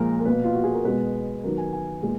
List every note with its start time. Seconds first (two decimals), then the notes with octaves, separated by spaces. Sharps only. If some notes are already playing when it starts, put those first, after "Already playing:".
Already playing: A#2 F3 G#3 A#4
0.20 A#4
0.25 B2 A#3 B4
0.44 F4
0.54 F#4
0.64 G#4
0.74 A#4
0.84 B2 G#3 B3 B4
1.43 D#3 F#3 B3 A#4
1.58 G#5
1.73 G#5
2.03 A#2 G#3 B3